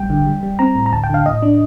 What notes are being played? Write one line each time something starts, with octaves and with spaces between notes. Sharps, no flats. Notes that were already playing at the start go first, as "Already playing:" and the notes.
Already playing: A1 G3 G5
D3
G3
G3
C4 A#5
A2
A#5
D2 A5
G5
D3 F5
A2 D#5
D4